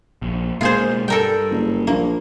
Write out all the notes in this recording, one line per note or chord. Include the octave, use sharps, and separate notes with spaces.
A#1
B2 G#3 A#3 F4 G#4 C5
G2 G3 A4 A#4 G5
F#1
A#1 A#3